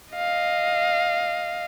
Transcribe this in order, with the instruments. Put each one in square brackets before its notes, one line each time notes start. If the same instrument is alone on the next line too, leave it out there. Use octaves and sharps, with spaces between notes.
[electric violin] D#5 F5